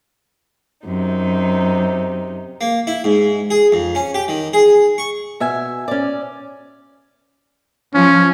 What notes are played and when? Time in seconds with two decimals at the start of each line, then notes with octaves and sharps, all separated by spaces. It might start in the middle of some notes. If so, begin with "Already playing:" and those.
0.85 F#2 C3 D#4
2.61 A#3
2.87 E4
3.04 G#2
3.51 G#4
3.72 F2
3.95 C#4
4.14 G4
4.28 D#3
4.53 G#4
4.98 C#6
5.40 B2 E5 G#5
5.88 C#4 D5
7.94 F3 C#4